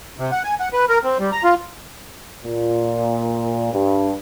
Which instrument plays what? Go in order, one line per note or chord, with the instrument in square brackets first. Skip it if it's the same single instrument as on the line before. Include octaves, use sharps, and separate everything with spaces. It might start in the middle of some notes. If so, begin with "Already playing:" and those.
[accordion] C3
F#5
G#5
F#5
B4
A#4
C4
G3
A#5
F4
[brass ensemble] A#2
G2